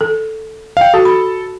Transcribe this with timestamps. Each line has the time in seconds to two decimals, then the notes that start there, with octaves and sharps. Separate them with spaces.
0.01 A4
0.77 F5 G5
0.94 F#4 A4 A5
1.05 B5